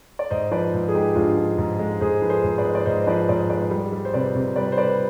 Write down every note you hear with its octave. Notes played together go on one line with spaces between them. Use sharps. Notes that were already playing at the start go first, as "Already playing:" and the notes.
D5
G#2 C5 D#5
F3 B4 D5
G#2
G#4
G#3 D#4 G4
G#2 D4 F4
F3
G#2
G#3
G#2 G#4 C5
F3 B4
G#4 C5
G#2 C5
B4 D5
G#3
D5
G#2 C5 D#5
D#5
F3 B4 D5
G#2 B4 D5
G#3 B4 D5
G3
G3
C5
C3 B4 D5
C3
G3 B4 D5
C5
G3 B4 D5
B4